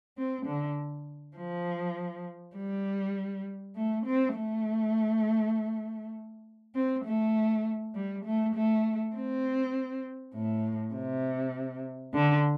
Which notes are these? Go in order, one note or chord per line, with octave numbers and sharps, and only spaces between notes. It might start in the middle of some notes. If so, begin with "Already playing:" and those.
C4
D3
F3
G3
A3
C4
A3
C4
A3
G3
A3
A3
C4
A2
C3
D3